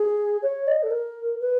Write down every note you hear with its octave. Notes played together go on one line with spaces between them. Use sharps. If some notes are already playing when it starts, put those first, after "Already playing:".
Already playing: G#4
C#5
D#5
A4
A#4
B4